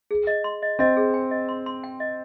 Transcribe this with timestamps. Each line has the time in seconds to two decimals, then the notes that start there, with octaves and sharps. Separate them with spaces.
0.11 G#4
0.27 D#5
0.44 C6
0.62 D#5
0.79 C4 D#5
0.97 G#4
1.14 G#5
1.31 D#5
1.49 C6
1.66 C6
1.84 G5
2.00 D#5